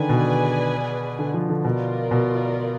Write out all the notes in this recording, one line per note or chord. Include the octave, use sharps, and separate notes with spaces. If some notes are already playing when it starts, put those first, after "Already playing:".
Already playing: D3 D#3 G#4 B4 D5 G#5
B2
D3
F3
D3
B2 F4 A#4 D5
B2